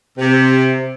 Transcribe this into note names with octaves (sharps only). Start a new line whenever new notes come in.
C3